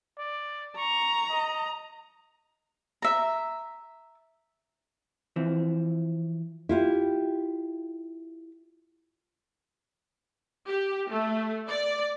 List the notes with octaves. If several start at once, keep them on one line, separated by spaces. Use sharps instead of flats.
D5
A#5 C#6
D#5
E5 A#5
E3 F3 C4
E4 F4 G4
G4
A3
D5